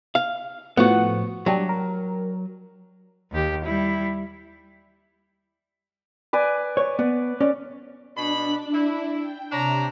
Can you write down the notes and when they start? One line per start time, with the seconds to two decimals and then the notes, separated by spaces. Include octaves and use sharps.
0.15 F5
0.77 A2 F3 B3 F#4 F#5
1.46 F#3 G3 D4 G4
1.69 A#4
3.32 D#2 G4
3.64 G3 E4
6.33 B4 D5 G#5
6.77 C#5
6.99 B3 D5
7.40 C#4 D5
8.17 B2 D4 B5
8.74 E4
9.19 G5
9.52 C3 D4 C#5 A#5